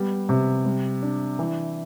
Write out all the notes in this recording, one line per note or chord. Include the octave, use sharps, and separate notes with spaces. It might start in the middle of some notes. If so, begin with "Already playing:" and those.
Already playing: G3 B3
C3
G3
D4
E3